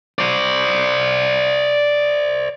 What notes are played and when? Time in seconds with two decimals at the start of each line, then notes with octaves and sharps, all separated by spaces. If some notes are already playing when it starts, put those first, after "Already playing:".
0.19 C5 D5